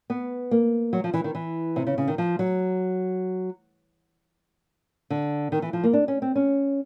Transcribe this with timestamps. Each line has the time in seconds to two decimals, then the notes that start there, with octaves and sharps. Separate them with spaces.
0.10 B3
0.51 A#3
0.93 F#3
1.04 F3
1.14 E3
1.24 D#3
1.35 E3
1.76 C3
1.87 C#3
1.98 C#3
2.08 D#3
2.18 F3
2.39 F#3
5.10 D3
5.52 D#3
5.62 E3
5.73 F3
5.84 A#3
5.93 D4
6.08 C#4
6.22 C4
6.36 C#4